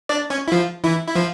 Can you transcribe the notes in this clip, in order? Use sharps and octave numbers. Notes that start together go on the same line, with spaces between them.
D4 D5
C#4 C#5
E4
F3 F4
E3 E4
E4
F3 F4